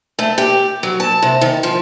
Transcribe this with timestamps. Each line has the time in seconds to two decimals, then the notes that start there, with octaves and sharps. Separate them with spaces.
0.19 A3
0.38 G4
0.83 F#3
1.00 A5
1.22 C3
1.41 D#3
1.63 F3